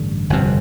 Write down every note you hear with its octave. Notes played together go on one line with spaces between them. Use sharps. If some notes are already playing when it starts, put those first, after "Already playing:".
Already playing: A1 G2 D3
G1 F2 C3